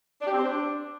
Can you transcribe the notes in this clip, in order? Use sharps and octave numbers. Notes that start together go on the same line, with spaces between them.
D4
G4
C4
C5
D4